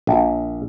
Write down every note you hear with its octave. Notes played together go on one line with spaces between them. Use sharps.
A#1